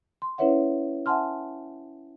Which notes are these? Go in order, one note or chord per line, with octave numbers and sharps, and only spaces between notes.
C6
C#4 E4 B4 C#5 E5 F#5
E5 F#5 G#5 A5 C6 F6